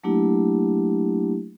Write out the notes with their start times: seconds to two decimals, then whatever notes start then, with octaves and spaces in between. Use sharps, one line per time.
0.03 F#3 A3 A#3 D4 E4 G4